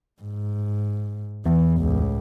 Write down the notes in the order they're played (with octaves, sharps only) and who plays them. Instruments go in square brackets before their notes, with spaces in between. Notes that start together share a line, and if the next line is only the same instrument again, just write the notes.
[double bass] G#2
[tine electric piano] E2 [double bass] E3
[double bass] C#2 A2